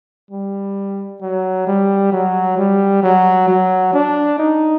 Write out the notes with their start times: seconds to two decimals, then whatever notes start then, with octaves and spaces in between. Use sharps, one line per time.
0.31 G3
1.22 F#3
1.67 G3
2.12 F#3
2.57 G3
3.03 F#3
3.48 F#3
3.93 D4
4.38 D#4